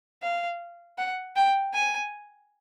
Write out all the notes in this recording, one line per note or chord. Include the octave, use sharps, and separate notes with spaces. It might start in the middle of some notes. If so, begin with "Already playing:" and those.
F5
F#5
G5
G#5